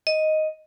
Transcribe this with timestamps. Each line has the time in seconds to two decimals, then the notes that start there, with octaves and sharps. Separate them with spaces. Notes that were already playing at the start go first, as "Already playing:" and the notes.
0.07 D#5